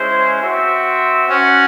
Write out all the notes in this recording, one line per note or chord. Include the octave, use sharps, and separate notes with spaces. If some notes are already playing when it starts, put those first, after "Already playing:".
Already playing: G#3 C#4 E4 C5
C4 F#4 C5 E5
C#4 F#4 C5 F#5